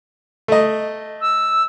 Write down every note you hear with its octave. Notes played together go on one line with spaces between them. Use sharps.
A3 D#5
E6